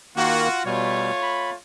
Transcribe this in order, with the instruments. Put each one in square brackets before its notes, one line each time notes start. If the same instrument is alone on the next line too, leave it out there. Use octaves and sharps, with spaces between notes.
[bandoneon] D#3 A#3 [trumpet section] F4 F#4
[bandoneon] B2 G3 [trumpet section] A3 F4 C#5
[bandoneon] B5